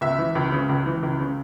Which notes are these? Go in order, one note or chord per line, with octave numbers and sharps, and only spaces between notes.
C#2 E5
E3
C#2
C#3
C#2
E3
C#2
C#3